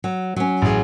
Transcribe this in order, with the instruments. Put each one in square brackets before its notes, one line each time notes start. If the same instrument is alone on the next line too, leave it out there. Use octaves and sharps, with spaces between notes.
[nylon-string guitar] F#3
F#3 C#4
[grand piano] A1 G#4